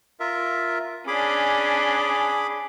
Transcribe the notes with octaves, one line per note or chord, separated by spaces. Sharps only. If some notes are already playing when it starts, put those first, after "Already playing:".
F4 A#4 E5
C#4 D4 G#4 B5 D6